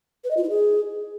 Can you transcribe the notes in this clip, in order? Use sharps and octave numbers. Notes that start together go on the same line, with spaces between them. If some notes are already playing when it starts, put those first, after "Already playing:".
B4
D#5
F4
E4
G#4